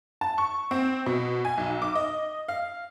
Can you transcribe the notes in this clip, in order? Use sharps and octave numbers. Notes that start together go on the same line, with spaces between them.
A5
C#6
C4
B2
G#5
B1
D6
D#5
F5